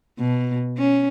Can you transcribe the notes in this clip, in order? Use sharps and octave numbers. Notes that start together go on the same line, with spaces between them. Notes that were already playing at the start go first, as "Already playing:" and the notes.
B2
C#4